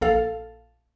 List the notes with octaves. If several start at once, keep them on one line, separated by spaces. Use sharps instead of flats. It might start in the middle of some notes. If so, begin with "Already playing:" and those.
A#1 A4 F5